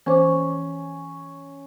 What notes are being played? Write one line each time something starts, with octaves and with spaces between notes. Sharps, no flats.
E3 C#4 C5 D6